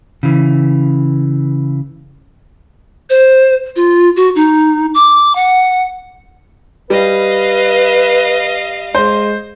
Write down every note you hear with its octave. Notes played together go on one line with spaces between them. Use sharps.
C#3 E3
C5
F4
F#4
D#4
D6
F#5
G3 B4 D#5 F5
G#3 C5